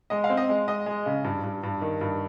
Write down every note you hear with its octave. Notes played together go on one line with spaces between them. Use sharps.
G#3 D#5
F5
C4
D#5
G#3
G#3 D#5
G#3
C#3
G2
G2
G2
D#3
G2